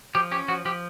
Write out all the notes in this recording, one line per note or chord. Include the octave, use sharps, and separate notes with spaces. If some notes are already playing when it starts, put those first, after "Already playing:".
F3 G4
C#4 G4
F3 F#4
F3 G4